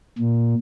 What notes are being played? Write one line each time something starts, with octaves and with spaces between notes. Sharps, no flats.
A#2